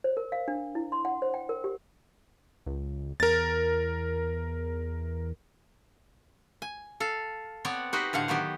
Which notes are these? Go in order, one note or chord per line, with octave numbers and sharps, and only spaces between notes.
C5
A#4
F5
D4
E4
C6
F#5
C5
G5
A#4
G4
C#2
E2 A#4 A6
G#5
A4 F5
B3 C4 C#5 D5 F#5
D#4 F#4 G4 B4 C5
A2 D3 F5 F#5
D#3 F#3 B3 G4